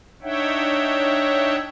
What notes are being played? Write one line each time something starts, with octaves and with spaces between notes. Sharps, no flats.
D4 D#4 C#5 E5 F#5 G5